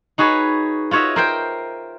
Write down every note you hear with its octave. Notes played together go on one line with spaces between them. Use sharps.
D#4 F#4 G#4 B4 C#5
F4 F#4 C#5 D#5 E5
A#4 C5 G5